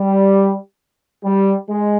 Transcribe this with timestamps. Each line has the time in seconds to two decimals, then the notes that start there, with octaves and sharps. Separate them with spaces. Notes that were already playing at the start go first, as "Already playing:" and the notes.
Already playing: G3
1.24 G3
1.68 G#3